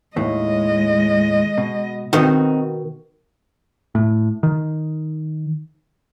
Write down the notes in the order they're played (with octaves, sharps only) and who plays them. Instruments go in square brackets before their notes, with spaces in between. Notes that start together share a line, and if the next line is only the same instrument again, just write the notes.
[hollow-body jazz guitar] D#2 A2 [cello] G#3 D#5
[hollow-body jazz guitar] B2
[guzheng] B2 D#3 [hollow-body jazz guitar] C4 D#4 F#4
[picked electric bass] A2
D#3